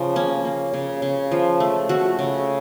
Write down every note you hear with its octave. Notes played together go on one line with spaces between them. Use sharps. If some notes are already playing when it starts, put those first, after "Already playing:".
Already playing: C#3 F3
A#3 C#4
A#3
C#3
C#3
F3
A3
A3 F#4
C#3